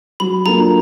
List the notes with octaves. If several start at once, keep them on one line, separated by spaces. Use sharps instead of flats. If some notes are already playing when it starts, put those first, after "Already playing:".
F#3 B5
A#3 D4 F4 A4 A#5